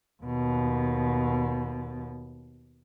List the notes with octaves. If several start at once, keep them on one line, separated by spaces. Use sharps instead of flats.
D#2 B2